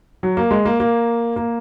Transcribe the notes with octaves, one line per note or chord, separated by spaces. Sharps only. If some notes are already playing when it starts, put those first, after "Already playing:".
F#3
A#3
G#3
A#3
A#3
A#3